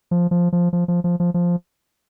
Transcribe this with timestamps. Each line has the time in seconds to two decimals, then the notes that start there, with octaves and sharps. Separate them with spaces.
0.11 F3
0.31 F3
0.53 F3
0.73 F3
0.88 F3
1.04 F3
1.20 F3
1.34 F3